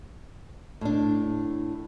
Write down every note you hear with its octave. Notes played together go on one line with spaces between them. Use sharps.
A2 D4